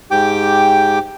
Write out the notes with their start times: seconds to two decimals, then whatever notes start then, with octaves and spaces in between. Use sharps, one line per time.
0.11 G#2 G4 G5 D6